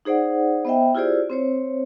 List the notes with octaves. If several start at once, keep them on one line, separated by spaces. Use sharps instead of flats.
D#4 G#4 C5 D5 F#5
B3 C5 D#5 E5 G5
E4 F4 G4 G#4 C5 D5
C4 C5 C#5